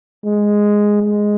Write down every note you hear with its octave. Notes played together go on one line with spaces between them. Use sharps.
G#3
G#3